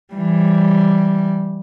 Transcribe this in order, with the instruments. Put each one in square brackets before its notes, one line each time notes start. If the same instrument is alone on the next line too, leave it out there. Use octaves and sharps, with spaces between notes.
[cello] E3 G3